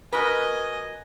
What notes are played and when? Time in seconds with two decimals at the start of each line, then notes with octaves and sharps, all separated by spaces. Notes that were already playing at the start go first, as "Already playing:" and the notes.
0.13 F#4 A#4 B4 D#5 G#5